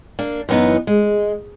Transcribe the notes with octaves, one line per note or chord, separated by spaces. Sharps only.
A#3 D4
F#2 E3 B3 D#4
G#3